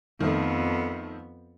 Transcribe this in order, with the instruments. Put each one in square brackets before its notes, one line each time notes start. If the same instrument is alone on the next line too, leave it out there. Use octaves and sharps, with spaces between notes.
[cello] F2 B3 [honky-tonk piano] D#3 F3 A3